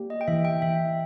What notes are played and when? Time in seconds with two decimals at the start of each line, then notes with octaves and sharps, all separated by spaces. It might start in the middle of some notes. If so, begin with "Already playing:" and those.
Already playing: A#3 G4
0.10 D#5
0.21 G5
0.28 E3 E5
0.45 G5
0.62 E3 E5